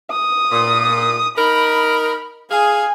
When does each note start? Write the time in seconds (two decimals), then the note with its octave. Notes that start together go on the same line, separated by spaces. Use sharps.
0.11 D#6
0.51 A#2
1.37 D#4 A#4 B5
2.51 G#4 F5 G#5